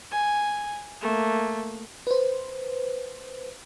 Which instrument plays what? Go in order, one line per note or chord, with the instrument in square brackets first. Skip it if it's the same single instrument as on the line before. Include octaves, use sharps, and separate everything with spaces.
[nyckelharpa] G#5
A3 A#3
[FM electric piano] B4 C5